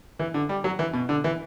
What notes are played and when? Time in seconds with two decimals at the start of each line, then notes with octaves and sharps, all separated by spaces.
0.19 E3
0.34 D3
0.49 G3
0.64 F#3
0.79 E3
0.93 B2
1.09 D3
1.24 E3